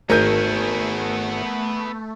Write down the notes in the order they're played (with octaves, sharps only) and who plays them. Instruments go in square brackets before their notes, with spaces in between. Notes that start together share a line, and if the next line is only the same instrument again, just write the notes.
[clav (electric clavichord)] G#1 G#5 [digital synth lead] A3 [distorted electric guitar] B3 G#4 [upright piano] A#4 G6